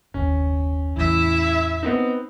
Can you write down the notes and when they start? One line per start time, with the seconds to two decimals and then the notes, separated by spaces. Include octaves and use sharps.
0.14 F#1 D#2 C#4
0.97 E2 A2 E3 E4 E5
1.83 B3 C4 D#4